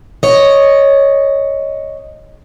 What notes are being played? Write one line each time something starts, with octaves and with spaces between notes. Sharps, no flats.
C#5 D#5